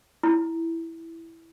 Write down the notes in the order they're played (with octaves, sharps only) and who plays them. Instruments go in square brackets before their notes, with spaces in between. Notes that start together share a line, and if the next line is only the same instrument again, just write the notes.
[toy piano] E4